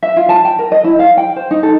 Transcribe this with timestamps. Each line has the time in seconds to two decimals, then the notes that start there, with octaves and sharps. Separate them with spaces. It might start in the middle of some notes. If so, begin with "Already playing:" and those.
0.03 E5
0.16 F4
0.29 A5
0.45 G5
0.59 A#4
0.72 D#5
0.84 E4
0.99 F5
1.17 G5
1.36 C5
1.51 D#4
1.63 A4